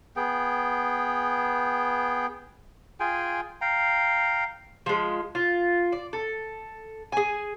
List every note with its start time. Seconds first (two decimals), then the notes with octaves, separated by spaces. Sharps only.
0.16 B3 G#4 G5
3.00 F4 G#4 G5 G#5
3.61 F5 G5 A#5
4.86 F3 G#3
5.35 F4
5.92 D5
6.13 A4
7.12 G#4 G#5